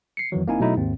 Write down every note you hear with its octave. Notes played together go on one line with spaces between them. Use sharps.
C7 C#7
F2 D#3 E3 F#3
G1 A#3 C4 D#4 E4 G#5
B2 F#3 A3 D#4 E4
D#2 G#2 C4